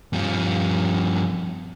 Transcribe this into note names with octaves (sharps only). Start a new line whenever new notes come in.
G2 F3